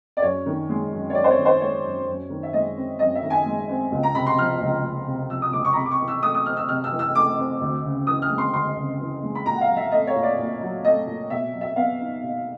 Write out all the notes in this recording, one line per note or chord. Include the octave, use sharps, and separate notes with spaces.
D5
F#2 C#5
D#3
G#3
F#2
C#5
F#2 D5
C5
C#5
D#3
C5
G#3 C#5
F#2
F#2
D#3
E5
G#3 D#5
C4
F#2 D#5
E5
D#3
G#5
G#3
C4
C#2
A#5
C3 B5
C6
F3 F6
C#2
C#2
C3
F3 E6
D#6
C#2 D6
C#6
A#5
C3 B5
D6
C#6
E3
E6
A3 D#6
D#6
C4 F6
E6
C3 F6
E6
E3
E6
A3 D6
C4
D2
C#3
E3 D#6
F6
G#3
C6
D2 C6
C#3
E3
G#3
B5
A#2 A#5
F#5
F5
F#3
E5
A3 D#5
C#5
A#2
D5
A#2
F#3
A3 D#5
A#2
B2 E5
F#3
E5
B3 F5
D#4
B2